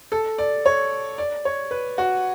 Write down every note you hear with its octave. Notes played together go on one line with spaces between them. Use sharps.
A4
D5
C#5
D5
C#5
B4
F#4